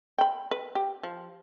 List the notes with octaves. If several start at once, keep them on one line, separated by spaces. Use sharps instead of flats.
G5 B5
B4
G4
F3